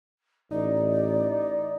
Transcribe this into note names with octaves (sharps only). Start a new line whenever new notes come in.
A1 D#4 D5